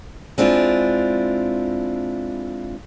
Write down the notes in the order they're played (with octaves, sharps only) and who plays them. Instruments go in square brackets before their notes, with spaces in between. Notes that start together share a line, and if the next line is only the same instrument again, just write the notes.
[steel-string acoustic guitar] G#3 C4 D4 E4 F4